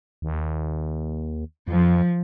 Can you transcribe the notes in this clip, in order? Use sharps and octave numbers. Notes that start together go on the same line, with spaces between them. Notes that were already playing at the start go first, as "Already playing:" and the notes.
D#2
F2 F3